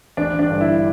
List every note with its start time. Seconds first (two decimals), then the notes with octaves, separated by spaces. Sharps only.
0.17 A1 D4
0.39 D4
0.50 G2 D3
0.61 E4